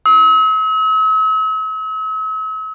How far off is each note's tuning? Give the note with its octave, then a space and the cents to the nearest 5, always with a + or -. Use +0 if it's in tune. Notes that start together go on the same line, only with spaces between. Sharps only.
E6 -45